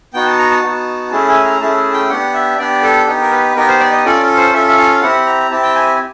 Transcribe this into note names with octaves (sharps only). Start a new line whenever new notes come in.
B3 D#4 F#4 G5
A5
A#5
A5
B3 D#4 F#4
A3 C#4 E4 G#4 A5
G#5
A#5
A3 C#4 E4 G#4 A5
A5
G5
B3 D4 G4 F#5
E5
B3 D4 G4 D5
A4
B3 D#4 G4
A#4
B4
B3 D#4 G4 A#4
C5
D5
D#5
C#4 F4 A4 D5
C5
C#4 F4 A4 E5
E5
F5
C4 E4 G4 F#5
A#5
C4 E4 G4 A5
G5
G#5